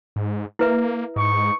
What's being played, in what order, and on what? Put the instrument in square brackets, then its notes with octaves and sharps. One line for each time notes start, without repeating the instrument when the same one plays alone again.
[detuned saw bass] G#2
[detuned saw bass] A#3 [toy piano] E4 B4 E5
[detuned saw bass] G#2 [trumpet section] D#4 C#6